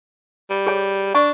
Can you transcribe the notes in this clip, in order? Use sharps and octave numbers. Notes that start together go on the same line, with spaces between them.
G3
G#4 C#5 G#5
D4 D5 G#5 C#6